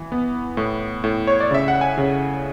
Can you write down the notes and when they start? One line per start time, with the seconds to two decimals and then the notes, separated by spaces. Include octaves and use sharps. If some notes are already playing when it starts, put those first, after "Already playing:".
Already playing: E3
0.12 B3
0.57 A2
1.04 A2
1.27 C#5
1.40 D5
1.51 C#3 E5
1.68 F#5
1.81 G#5
1.98 C#3